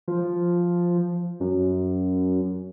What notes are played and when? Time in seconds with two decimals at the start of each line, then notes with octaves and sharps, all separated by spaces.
0.08 F3
1.40 F#2